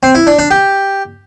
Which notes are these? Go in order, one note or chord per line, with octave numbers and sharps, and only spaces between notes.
C4
E4
D4
D4
G4